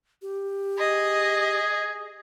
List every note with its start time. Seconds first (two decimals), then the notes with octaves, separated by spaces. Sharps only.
0.22 G4
0.78 G#4 D#5